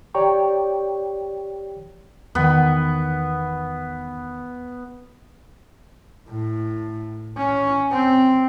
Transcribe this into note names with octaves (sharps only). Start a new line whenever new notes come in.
G4 C#5 D5 G5 A#5 C#6
E2 D#3 B3
A2
C#4
C4